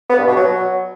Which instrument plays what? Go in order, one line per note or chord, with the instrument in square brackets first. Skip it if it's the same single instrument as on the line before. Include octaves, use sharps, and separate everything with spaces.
[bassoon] B3
G2
B2
F#3